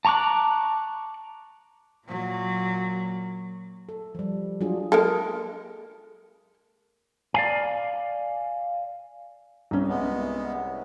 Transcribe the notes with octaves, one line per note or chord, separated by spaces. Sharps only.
A5 A#5 C#6 D6 F#6
A#2 F#3
A4
F3 G3
F#3 G#3 D4 F4 G#4
G#3 A#3 A4
D5 F5 G#5
C2 C#4
G#3 B3